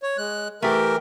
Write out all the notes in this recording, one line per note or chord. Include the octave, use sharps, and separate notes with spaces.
C#5
G#3 F#6
E3 A3 G4 A#4